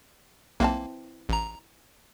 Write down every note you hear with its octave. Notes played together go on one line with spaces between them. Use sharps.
B1 E3 A#3 C4 A5
A1 A#5